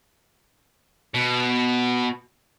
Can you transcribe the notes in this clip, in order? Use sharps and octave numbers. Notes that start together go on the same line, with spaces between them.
B2